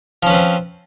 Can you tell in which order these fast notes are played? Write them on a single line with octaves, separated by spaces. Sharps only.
F3 C#4 B4 C4